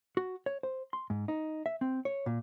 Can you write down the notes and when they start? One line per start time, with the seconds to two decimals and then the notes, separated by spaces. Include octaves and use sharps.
0.17 F#4
0.46 C#5
0.63 C5
0.93 C6
1.10 G#2
1.28 D#4
1.66 E5
1.81 C4
2.05 C#5
2.26 A#2